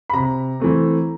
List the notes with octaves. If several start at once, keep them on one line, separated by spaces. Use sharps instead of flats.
B5
C3 A#5
E3 A3 C4